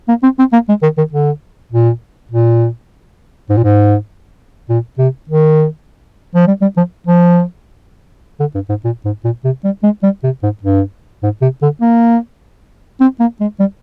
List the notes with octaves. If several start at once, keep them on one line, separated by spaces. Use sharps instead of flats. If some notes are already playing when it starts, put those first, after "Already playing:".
A#3
C4
C4
A#3
G#3
D#3
D#3
D3
A#2
A#2
G#2
A#2
G#2
A#2
C3
D#3
F3
G3
G3
F3
F3
D3
G2
G#2
A#2
G#2
A#2
C3
G3
G#3
G3
C3
G#2
G2
G#2
C3
D3
A#3
C4
A#3
G#3
G3